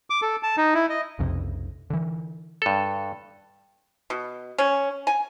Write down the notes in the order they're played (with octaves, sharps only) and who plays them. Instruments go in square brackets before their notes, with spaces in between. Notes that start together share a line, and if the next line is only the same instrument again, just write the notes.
[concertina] D6
A4
A5
D#4
E4
D#5
[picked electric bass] B1 F2 C3
D3 E3
[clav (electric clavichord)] G2 A4
[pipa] B2
C#4
G#5